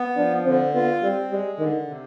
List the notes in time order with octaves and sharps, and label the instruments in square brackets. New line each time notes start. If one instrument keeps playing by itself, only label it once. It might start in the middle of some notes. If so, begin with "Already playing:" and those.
Already playing: [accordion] B3
[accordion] F3 [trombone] D4
[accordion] D3 [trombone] C4
[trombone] B3 [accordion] F4
[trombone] G3 [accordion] C4
[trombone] G3 [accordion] G#3
[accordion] D3 [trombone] D#3
[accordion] C3